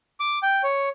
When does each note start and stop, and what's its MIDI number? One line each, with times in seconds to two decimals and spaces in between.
0.20 0.39 86
0.43 0.62 79
0.63 0.89 73